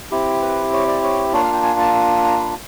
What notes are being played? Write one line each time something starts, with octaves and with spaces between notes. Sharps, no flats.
C4 E4 G4
B4
C#5
D5
C#5
A#3 D4 F4 C#5
F5
G5
G#5
A5
A#5
B5